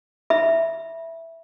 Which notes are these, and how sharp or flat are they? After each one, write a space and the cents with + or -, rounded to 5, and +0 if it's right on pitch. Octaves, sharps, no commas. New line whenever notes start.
E5 +0 B5 -30